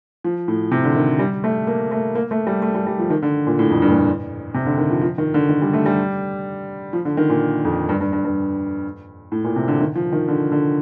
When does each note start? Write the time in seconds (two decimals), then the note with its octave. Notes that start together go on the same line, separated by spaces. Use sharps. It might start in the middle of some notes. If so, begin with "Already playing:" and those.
0.24 F3
0.48 A2
0.71 C3
0.84 D3
0.96 D#3
1.19 G3
1.44 A3
1.67 A#3
1.91 A3
2.15 A#3
2.31 A3
2.47 G3
2.62 A3
2.74 G3
2.87 G3
2.99 F3
3.10 D#3
3.23 D3
3.47 A#2
3.59 A2
3.70 F2
3.82 G2
3.90 A#2
3.94 A2
4.54 C3
4.66 D3
4.78 D#3
4.90 F3
5.01 F3
5.18 D#3
5.34 D3
5.49 D#3
5.62 G3
5.73 A3
5.86 G3
6.93 F3
7.05 D3
7.17 D#3
7.30 A#2
7.65 F2
7.89 G2
8.01 G2
8.13 G2
8.25 G2
9.32 A2
9.44 A#2
9.56 C3
9.68 D3
9.81 D#3
9.96 F3
10.12 D#3
10.28 D3
10.52 D3